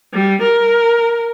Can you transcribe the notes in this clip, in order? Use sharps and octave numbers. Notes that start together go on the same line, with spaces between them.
G3
A#4